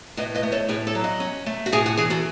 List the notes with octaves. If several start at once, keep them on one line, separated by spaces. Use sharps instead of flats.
A2 B4 D#5
B4 D#5
A3
A4 C#5
A2 G#4 B4
A4 C#5
F#3
D#5 F#5
C#4
A3
F#4
A2 G#4
F#4
E3 G#4
F#4 A4